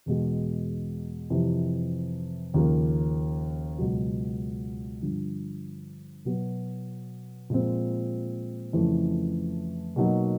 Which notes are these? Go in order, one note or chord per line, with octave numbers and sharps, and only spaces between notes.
E2 B2 G#3
F2 C3 E3
D#2 C#3 F3 A#3
C#2 B2 F#3
G2 D3 F3
B2 F#3 B3
A#2 F3 G#3 C4
F2 C#3 E3 A3 C#4
B2 F#3 A#3 D#4